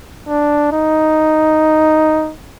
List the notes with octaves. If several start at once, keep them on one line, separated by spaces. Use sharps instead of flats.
D4
D#4